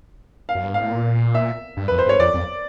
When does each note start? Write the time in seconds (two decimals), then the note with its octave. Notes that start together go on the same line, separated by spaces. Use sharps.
0.49 F5
0.55 F#2
0.64 G2
0.73 G#2 F5
0.82 A2
0.91 A#2
1.35 E5
1.77 G2
1.88 F2 B4
1.99 C5
2.06 G2 C#5
2.19 F2 D5
2.34 F2